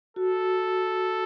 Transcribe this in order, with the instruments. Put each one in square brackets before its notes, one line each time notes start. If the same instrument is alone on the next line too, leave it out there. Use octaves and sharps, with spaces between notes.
[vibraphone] F#4 [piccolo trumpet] A4